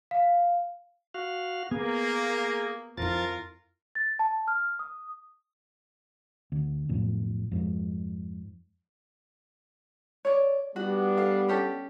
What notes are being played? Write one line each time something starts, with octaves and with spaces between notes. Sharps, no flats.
F5
F#4 F5
A#3 B3 G#4
F2 F3 E4 F4 A#4 A6
A6
A5
F6
D#6
D2
B1 F2 A2
F2 G#2
C#5 D5
G3 B3 D4 F#4
A4 F5
C#4 G4 A4